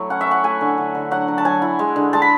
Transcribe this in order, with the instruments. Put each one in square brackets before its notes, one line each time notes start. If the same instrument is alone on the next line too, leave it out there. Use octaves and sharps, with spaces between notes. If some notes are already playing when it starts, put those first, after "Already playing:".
Already playing: [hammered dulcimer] F#3 A3 E4
C#4 F#5
E5
C#4 F#5
A3 G#5
D3
D3
D3
F#3 F#5
F#3
A5
F#3 G#5
E4
G#3
D3
G#3 A5
B5